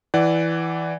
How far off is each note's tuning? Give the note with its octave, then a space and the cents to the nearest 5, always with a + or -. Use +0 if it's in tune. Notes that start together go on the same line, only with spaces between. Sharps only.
E3 +0 D5 +0 F#5 +25